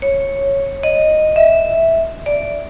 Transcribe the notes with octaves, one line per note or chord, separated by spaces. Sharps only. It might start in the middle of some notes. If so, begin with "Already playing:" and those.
C#5
D#5
E5
D5